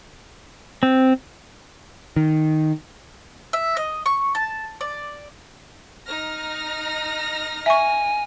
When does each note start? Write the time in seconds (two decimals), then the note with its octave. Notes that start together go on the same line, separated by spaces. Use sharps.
0.83 C4
2.16 D#3
3.53 E5
3.77 D#5
4.06 C#6
4.35 A5
4.81 D5
6.07 D#4 F6 A#6
7.66 E5 G#5 C#6